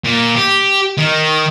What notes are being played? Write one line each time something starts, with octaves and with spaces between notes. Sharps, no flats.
A#2
G4
D#3